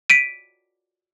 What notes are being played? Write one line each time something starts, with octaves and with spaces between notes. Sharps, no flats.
B6 D7 D#7